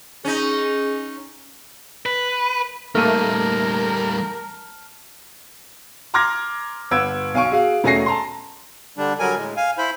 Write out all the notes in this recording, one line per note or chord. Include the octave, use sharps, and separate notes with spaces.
C#4 D#4 G#4
B4
G3 A3 A#3 D#4 A#4 A5 F6
A#5 C6 D6 F6 G#6 A#6
G1 B4 F#5 E6 G#6 D7
B1 F5 G#5 C#6 D7
F#4 G#4 F5
E1 A3 C#4 G#5 A#6 C7
A5 A#5 C6
D3 G3 D4
D3 F#3 G3 A#4 G#5
A2 G#3
F5 G#5
E4 C5 B5